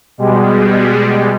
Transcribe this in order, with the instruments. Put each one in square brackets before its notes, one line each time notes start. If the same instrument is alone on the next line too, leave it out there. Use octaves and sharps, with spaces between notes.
[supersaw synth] B2 G3 G#3